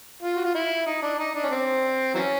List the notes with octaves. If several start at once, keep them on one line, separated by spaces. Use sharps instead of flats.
F4
F#4
F4
E4
D#4
D4
D#4
D4
C#4
C4
E3 F#3 C#4